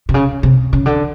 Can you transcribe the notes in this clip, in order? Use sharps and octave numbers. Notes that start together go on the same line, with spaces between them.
C3
C#3
C3
C#3
D3